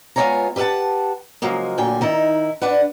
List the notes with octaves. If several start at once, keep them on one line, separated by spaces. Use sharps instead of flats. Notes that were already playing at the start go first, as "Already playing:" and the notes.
G#3 B3 F4 C#5 G#5 A#5
G4 B4 E5 F#5 A5
C#3 F3 F#3 G#3 A#3
D2 A#2 D3 F#3 G5 G#5
D#3 D#4 E4
D4 B4 F#5